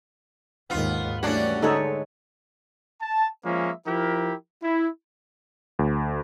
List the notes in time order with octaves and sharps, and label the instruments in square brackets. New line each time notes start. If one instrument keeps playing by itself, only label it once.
[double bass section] D#2 G#2 D#3 [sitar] B3 F4
[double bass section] E3 G3 A3 [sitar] C#4 D4 F#4 [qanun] C#5 D5
[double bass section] D3 [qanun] G#3 B4 C#5 [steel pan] D#4 A4
[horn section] A5
F3 G#3 A#3 C#4 E5
F3 E4 G4 A#4
E4
[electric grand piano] D2